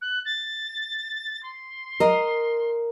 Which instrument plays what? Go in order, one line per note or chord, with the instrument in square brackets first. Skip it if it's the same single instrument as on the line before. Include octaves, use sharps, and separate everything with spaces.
[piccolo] F#6
A6
C6
[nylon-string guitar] A#4 D#5